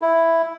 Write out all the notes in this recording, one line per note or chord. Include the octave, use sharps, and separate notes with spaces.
E4